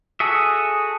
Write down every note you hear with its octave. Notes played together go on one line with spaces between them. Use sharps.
F#4 G#4 A4 E5